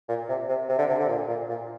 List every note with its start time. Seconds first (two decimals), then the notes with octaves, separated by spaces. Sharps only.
0.08 A#2
0.29 C3
0.48 C3
0.69 C3
0.78 D3
0.89 C3
0.99 D3
1.09 A#2
1.28 A#2
1.49 A#2